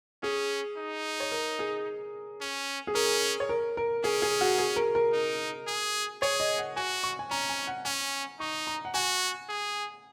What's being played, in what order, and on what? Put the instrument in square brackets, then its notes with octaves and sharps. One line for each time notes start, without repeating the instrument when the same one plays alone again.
[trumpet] C#4 [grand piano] G#4
[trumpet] D#4
[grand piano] C#5
A#4
G#4
[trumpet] C#4
[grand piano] G#4
[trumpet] C#4 [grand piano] A#4
[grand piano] C#5
A#4
A#4
[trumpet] C#4 [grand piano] G#4
[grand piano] G#4
F#4
G#4
A#4
A#4
[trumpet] D#4
G#4
[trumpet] G#4 [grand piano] C#5
[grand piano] D#5
F#5
[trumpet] F#4 [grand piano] G#5
[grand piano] C#6
G#5
[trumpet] C#4 [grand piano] A#5
[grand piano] G#5
F#5
[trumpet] C#4 [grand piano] G#5
[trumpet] D#4 [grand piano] C#6
[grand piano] A#5
F#5
[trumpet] F#4 [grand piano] G#5
[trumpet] G#4